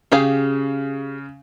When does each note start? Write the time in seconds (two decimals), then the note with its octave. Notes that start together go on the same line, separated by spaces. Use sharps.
0.12 C#3 G4 G#4 F5